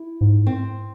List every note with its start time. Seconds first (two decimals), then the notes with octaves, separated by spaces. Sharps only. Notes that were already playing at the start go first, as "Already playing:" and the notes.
Already playing: E4
0.21 G#2
0.47 C4